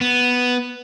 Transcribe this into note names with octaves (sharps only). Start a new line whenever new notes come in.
B3